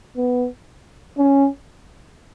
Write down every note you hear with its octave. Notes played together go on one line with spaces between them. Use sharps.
B3
C#4